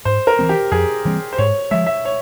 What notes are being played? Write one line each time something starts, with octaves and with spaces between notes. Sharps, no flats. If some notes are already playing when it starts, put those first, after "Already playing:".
G#2 C5
A#4
E3 G3 C4
G4
F2 G#4
E3 G3 C4
C5
G#2 C#5
F3 G#3 E5
E5
C#5